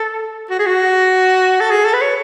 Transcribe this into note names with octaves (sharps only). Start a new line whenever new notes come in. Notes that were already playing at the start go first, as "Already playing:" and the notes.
Already playing: A4
F#4
G#4
F#4
A4
G#4
A4
B4
C#5